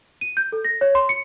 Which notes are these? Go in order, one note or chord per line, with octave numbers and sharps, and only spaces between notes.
D#7
G6
A4
A#6
C#5
C6
C#7